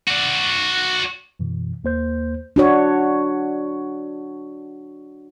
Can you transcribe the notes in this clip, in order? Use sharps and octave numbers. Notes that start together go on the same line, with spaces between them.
F#4 D5
F#2 B2 E3
D#2 A#3 C5 G6
D4 F#4 C#5